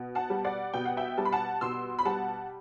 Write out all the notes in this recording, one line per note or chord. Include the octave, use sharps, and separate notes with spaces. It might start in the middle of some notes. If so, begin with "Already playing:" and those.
Already playing: B2
F#5 A5
G3
D5 F#5
B2 G5
F#5
E5 G5
G3 A5
B5
F#5 A5
B2 C6 E6
B5
G3 F#5 A5